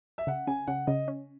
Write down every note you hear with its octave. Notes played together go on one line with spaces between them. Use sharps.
E5
C#3 F#5
C#3 G#5
C#3 F#5
C#3 D#5
C#4